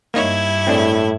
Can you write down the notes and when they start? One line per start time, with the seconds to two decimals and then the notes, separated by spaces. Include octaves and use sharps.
0.14 G2 A#3 D#4 E4 C#5 G#6
0.67 A2 C4 D4 G#4